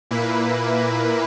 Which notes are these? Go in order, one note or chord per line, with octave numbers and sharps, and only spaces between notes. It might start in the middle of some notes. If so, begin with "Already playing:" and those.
A#2 A#3 E4 B4